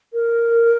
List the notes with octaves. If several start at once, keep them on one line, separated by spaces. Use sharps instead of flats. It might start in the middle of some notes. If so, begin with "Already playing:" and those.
A#4